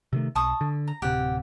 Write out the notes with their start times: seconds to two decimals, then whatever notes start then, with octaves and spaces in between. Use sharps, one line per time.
0.13 C3 D#3 A3
0.35 B1 A5 C#6 D#6
0.61 D3
0.88 A#5
1.02 D1 C3 G4 F#5